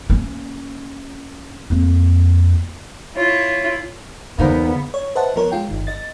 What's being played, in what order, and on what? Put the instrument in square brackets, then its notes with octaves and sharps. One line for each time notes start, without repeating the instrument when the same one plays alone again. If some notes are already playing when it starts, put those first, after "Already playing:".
[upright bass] A#3 C#4
F2 A#3
[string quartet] E4 F4 [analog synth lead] C#5
[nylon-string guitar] E2 D#4 A#4 [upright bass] D3 [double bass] B3 [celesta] G#4 C5 F5
[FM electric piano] C#5
B4 C5 D#5 E5 F#5 A5
F3 B3 A#4 C#5
G#3 F4 G5
G1 D#3
D#5 A6